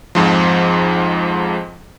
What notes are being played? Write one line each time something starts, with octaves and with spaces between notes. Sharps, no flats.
F2 G#2 F3